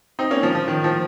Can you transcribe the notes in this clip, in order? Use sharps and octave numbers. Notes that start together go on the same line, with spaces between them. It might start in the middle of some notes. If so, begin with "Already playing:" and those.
C4 D#4
A#3 C#4
F3
F3
D#3
F3